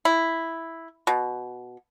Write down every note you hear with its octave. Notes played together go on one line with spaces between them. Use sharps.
E4
B2